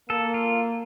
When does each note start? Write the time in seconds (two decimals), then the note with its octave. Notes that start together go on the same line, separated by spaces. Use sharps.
0.10 A#3 A4
0.34 F4